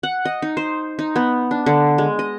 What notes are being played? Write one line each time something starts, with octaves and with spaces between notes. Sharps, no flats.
F#5
D#5
D#4
C5
D#4
B3
D4
D3
G#3
D#5